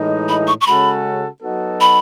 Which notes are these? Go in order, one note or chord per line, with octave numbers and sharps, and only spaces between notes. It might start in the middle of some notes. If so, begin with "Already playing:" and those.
Already playing: A2 E3 G#3 D#4
B5
C#6
C#6
C#3 G#3 C#4 F#4 A4 B5
F#3 B3 D#4 F#4 A4
B5